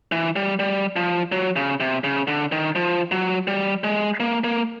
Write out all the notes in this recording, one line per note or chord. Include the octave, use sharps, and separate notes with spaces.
E3
G3
G3
F3
F#3
C#3
C3
C#3
D3
D#3
F3
F#3
G3
G#3
A#3
A#3